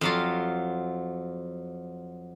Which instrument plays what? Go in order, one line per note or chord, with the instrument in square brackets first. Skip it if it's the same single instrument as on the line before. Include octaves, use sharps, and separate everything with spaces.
[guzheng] F2 F#3 F4